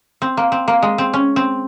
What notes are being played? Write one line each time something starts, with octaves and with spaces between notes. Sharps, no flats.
C4
A#3
C4
A#3
G#3
C4
C#4
C4